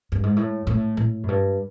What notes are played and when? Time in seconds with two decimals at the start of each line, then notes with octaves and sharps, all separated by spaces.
0.12 G2
0.23 G#2
0.36 A2
0.67 A2
0.97 A2
1.23 F#2
1.28 G2